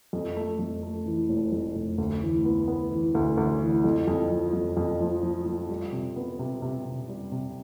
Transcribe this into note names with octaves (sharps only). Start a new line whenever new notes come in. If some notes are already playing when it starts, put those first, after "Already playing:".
F2
A3
F2
A3
E3
F1
F2
F1
D2
E3
B3
B3
E3
D2
D2
E3
F2
F2
F3
F2
F2
F3
F3
F3
G3
C3
B3
C3
C3
C3
G3
C3